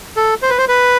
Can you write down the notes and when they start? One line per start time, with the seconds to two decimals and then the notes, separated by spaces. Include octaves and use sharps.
0.17 A4
0.42 C5
0.50 B4
0.58 C5
0.68 B4